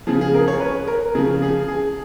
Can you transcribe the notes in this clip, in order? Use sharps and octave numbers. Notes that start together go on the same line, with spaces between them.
C#3 F3 G#4
G#4
A#4
C#5
B4
A#4
C#3 F3 G#4
G#4
G#4